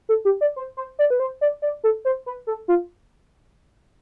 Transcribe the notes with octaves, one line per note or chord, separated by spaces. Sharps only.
A4
G4
D5
C5
C5
D5
B4
C5
D5
D5
A4
C5
B4
A4
F4